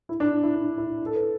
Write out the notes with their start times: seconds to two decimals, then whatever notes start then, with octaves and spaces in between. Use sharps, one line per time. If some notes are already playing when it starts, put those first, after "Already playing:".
0.09 E4
0.20 D4
0.43 E4
0.55 D4
0.78 E4
1.06 A4
1.16 B4